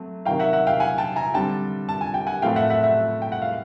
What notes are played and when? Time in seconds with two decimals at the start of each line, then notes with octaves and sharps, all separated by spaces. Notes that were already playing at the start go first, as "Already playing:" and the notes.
Already playing: F#3 A3 C4
0.25 C3 D#3 F#3 F5 G5
0.40 E5 F#5
0.53 E5 F#5
0.67 F5 G5
0.80 F#5 G#5
0.98 G5 A5
1.16 G#5 A#5
1.34 D3 G3 C4 G5 A5
1.89 A5
2.01 G#5
2.14 G5
2.27 F#5 G#5
2.42 A2 F3 A3 C4 F5 G5
2.56 E5 F#5
2.70 E5 F#5
2.83 E5 F#5
3.22 G5
3.32 F#5
3.42 F5